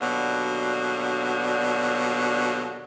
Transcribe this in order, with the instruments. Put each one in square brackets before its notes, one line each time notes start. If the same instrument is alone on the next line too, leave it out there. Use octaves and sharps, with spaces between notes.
[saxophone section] D#2 B2 D3 F#3 D4